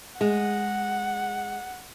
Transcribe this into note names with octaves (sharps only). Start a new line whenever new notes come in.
G#3 F#5